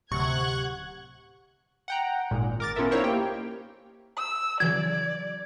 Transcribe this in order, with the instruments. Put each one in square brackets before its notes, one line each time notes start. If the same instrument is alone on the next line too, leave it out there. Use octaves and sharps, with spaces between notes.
[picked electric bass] D1 [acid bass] C3 [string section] F#5 F#6 G#6 [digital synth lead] C#6
[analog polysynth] F#5 G5 A#5
G#1 A#2 G#3
A#4 D6 A6
B3 C#4 F4 A4 A#4 E5
D#4 E4 A#4 C5 C#5 F5
A#3 G4 G5
[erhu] E6
[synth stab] C#3 E3 F#3 [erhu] D5 [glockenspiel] G#6